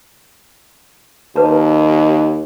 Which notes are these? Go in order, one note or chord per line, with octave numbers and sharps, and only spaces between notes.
D#2 B4 A5